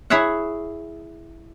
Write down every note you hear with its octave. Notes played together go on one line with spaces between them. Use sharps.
E4 G#4 C#5 E5 F#5